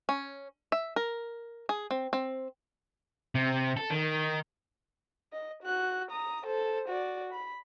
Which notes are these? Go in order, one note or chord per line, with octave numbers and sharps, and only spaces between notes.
C#4
E5
A#4
G#4
C4
C4
C3
A4
D#3
D#5
F#4 F#6
A#5 D#6
A4 C5
F#4 D5
B5